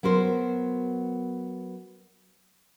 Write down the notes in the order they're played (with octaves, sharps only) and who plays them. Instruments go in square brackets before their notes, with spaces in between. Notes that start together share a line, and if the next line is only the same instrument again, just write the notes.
[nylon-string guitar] F#3 B3 A#4 C5